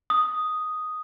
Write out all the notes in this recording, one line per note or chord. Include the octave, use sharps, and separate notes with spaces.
D#6